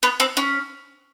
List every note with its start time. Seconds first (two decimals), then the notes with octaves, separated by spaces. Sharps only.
0.03 B3
0.20 C4
0.37 C#4